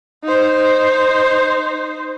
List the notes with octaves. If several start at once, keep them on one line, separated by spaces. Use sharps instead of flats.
D#4 C5